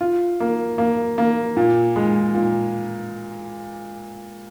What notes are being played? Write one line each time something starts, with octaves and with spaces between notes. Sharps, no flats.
F4
A#3
A#3
A#3
A#2
G#3
A#2